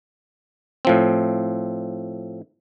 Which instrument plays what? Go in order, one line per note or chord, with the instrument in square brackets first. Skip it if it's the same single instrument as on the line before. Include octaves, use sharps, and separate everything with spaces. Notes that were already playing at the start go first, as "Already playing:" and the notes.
[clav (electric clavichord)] A2 F3 C4